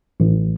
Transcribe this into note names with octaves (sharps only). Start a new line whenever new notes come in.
A1